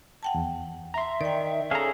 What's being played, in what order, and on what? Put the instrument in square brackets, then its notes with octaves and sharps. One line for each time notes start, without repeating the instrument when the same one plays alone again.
[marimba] F#5 G5 A5
[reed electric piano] E2
[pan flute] E5 [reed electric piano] A#5 C6
[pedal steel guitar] D#3 [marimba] D5 G5
[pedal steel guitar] C#4 G#4 A4 [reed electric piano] F5 A#5